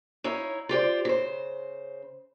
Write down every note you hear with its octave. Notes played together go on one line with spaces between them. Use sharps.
D#4 E4 C#5 F5
F4 G4 C5 D5
C#3 C5